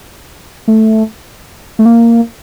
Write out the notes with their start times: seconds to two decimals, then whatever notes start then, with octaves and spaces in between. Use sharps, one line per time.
0.68 A3
1.79 A3
1.86 A#3